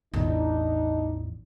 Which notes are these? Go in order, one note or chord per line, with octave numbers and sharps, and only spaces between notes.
A1 E2 D4 D#4